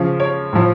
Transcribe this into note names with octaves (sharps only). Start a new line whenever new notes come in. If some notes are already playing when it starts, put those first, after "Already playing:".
Already playing: C#3 F3
C#5
A2 F3